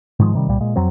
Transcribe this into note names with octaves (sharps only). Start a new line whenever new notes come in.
G#2 D#3 F3 G#3
C3 D#3 G3
C2 A#2 G3
A#2 G#3
F2 F#3 C4